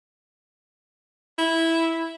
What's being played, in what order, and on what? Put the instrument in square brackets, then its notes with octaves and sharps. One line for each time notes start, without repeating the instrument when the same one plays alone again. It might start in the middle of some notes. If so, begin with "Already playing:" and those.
[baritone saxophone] E4